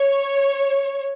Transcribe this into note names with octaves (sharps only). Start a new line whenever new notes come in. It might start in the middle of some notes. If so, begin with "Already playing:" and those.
Already playing: C#5